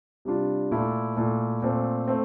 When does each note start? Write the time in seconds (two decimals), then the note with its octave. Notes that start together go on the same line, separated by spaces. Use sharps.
0.25 C3 G3 D4 F4
0.71 A#2 A3 E4
1.16 A#2 A3 E4
1.62 A#2 A3 C4
2.08 A3 C4